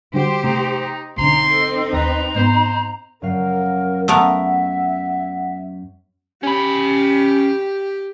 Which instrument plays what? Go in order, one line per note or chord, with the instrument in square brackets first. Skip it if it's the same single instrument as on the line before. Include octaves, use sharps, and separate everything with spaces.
[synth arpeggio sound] D3 G3 F#4 [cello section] G4 C5
[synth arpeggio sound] C3 A3 [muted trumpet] D#4 [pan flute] A#5
[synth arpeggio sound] B1 D3 [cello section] C4 D#4 [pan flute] A#5 [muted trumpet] C6
[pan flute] A4
[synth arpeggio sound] D#2 A#6 [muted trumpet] B4 [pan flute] A#5
[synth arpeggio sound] G#2 B3 B5 [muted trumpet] C5
[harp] F#2 F#3 F5 [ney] A#4
[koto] A3 B3 A#4 [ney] E5 [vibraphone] F#5
[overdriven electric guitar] C#4 B5 [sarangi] G4